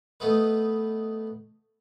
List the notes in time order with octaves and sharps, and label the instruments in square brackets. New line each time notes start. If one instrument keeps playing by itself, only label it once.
[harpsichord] A3 B3 D#4 B4